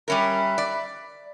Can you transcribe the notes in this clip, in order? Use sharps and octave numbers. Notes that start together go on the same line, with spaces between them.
G3 C#4 A#4 E5 B5 F#6
D5